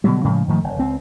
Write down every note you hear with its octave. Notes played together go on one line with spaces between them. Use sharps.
B2 D3 F#3 G3
A2 C#3 F3 G#3
G#2 D#3 F3 A3
F#1
C#2 C4